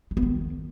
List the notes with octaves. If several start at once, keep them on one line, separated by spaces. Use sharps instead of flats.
G#3
B3
D#3